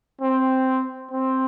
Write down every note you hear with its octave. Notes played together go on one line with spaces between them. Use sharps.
C4
C4